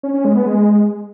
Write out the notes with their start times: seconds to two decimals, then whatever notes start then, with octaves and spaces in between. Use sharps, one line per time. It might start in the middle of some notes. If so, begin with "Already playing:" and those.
0.03 C#4
0.14 C#4
0.25 G#3
0.35 B3
0.46 G#3